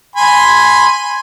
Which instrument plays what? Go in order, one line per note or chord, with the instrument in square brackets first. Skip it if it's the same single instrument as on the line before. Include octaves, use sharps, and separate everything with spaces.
[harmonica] G#5 B5 C6